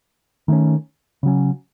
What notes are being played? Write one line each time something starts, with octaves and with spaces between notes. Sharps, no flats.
D#3 A3 C#4
C#3 F#3 C#4